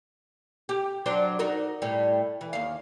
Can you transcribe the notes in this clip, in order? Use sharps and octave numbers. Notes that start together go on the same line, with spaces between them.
G4
F#3 D4 C5
D#4 F#4 A#4
A2 G3
E3
D#2 F5